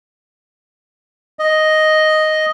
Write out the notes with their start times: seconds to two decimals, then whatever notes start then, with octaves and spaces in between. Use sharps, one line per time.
1.39 D#5